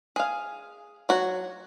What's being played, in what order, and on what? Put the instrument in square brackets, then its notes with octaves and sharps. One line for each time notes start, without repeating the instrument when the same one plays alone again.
[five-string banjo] G#4 F5
F#3 F#4